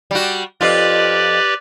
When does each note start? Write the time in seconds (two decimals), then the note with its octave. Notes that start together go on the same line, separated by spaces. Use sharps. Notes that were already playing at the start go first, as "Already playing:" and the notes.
0.11 G3 F#4
0.61 F2 F4 G4 B4 D5